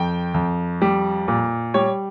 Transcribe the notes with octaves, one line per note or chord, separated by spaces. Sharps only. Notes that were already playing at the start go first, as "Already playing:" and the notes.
Already playing: F2 G5
F2
G3
A#2
G3 C#5